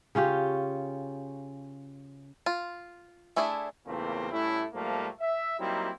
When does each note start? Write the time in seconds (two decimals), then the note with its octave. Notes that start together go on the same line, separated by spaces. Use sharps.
0.15 C#3 C#4 F4 G4
2.46 F4
3.36 A3 D4 E4 G#4 A4
3.87 E2 A#2 C#3 A3 A#3 C4
4.31 A2 G3 A3 C#4 E4
4.74 G#2 F3 G3 A3 A#3
5.20 E5
5.60 F#3 G3 A#3 C4 D#4 E4